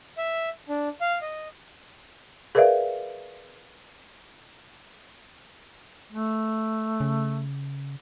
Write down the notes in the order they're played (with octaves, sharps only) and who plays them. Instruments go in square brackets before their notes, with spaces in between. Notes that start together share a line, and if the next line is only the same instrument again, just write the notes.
[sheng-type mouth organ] E5
D4
F5
D#5
[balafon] G#4 A#4 B4 D5 E5 F5
[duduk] A3
[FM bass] C#3